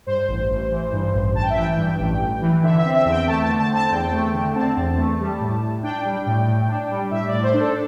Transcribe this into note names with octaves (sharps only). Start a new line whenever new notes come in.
G2 C5
A1
A1
E3
G2
A1
A1 A5
G5
E5
E3 G5
G2
A1
A1
E3
D3 E5
E5
C4
E5
E2 E5
G5
A3 A5
A5
D3
A5
C4
A5
E2 G5
A3
D3
C4 A5
E2
A3
G3
A2
A2
D4 G5
G3
A2
A2
D4
G3
A2 E5
D5
A2
C5
D4
A4